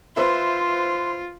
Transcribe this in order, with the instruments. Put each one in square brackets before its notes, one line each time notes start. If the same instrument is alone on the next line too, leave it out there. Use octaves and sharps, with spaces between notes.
[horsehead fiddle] F4 [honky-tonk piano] B4 C5 E5 [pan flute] C6